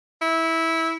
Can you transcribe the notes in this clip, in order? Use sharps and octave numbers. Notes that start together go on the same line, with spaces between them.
E4